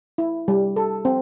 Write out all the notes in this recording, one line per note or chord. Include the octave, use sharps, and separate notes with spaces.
E4
G3
A4
C4